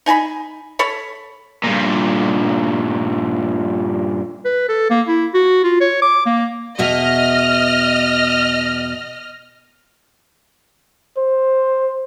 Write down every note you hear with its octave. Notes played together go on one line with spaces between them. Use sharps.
D#4 G#5 A5 B5
A4 C#5 B5
G2 A#2
B4
A4
A#3
E4
F#4
F4
C#5
D6
A#3
E2 B2 D#5 E5 F6
C5